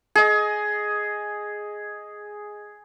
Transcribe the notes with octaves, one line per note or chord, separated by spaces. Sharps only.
G#4 D#5